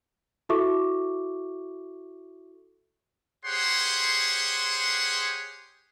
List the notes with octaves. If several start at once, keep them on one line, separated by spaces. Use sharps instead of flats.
E4 F#4 A4 E5 C#6 D6
G4 G#4 C5 C#5 F#5 C6